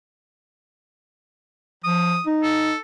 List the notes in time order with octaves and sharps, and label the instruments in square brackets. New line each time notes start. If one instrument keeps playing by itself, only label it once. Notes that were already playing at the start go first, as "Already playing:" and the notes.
[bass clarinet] F3 [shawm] D#6
[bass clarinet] D#4
[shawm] A4